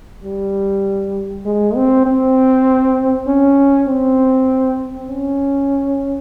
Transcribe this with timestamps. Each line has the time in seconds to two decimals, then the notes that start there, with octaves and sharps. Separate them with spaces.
0.24 G3
1.45 G#3
1.76 C4
2.06 C4
3.28 C#4
3.88 C4
5.10 C#4